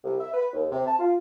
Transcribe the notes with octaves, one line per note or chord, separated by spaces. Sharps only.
C2
E5
B4
D#2
C3
A5
F4